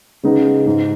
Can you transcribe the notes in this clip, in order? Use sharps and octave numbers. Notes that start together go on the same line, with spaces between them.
C#3 G#3 B3 D#4
G#2 G#3 D#4